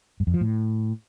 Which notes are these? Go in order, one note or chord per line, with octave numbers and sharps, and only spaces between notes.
G2
F2
F3
A2